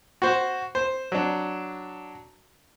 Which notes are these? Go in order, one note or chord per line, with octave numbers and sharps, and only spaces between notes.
F#4 C5
C5
F#3 D4